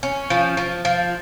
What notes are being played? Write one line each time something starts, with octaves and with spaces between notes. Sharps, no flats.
C#4
F3
F3
F3